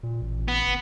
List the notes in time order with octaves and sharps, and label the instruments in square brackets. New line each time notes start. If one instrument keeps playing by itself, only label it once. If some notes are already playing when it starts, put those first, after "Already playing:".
[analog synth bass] A#2
A1
[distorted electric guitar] B3
[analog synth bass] G1